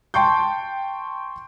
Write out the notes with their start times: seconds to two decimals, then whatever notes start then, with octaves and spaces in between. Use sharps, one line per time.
0.14 G5 A5 C6 C#6 G6